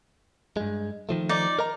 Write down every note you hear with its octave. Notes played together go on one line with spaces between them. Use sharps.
G2 G#3
D#3 F3 A3
D#4 D5
A#4 D#5 A#5